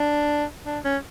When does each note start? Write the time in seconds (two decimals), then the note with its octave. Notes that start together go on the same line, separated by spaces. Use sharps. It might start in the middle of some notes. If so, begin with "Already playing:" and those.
Already playing: D4
0.66 D4
0.84 C#4